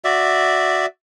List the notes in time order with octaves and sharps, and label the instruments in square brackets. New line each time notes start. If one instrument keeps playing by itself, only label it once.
[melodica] F#4 D5 E5